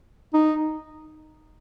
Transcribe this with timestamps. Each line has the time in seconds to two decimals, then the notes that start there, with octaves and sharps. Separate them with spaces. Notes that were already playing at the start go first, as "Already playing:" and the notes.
0.33 D#4